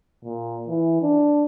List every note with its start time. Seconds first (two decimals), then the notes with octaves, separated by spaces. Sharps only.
0.24 A#2
0.68 E3
1.02 D4